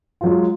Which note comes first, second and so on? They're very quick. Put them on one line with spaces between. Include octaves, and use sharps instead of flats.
F4 F#3 G#3